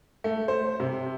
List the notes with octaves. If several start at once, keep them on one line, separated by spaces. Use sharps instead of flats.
A3
C5
C3